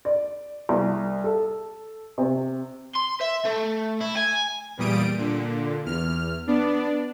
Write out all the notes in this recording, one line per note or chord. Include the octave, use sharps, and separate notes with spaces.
D5
C2
A4
C3
C6
E5
A3
E4
G#5
E2 A#2 G3 D#6 D7
A#2 D3
E2 F6
B3 D4 D5